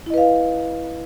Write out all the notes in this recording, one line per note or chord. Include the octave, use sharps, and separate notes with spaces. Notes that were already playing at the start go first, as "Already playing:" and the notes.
E4 B4 D#5 F5